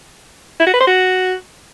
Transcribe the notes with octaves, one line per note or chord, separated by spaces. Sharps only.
E4
F#4
B4
C5
F#4